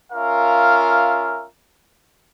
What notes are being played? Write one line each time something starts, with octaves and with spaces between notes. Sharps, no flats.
C#4 F4 A#4 E5 F5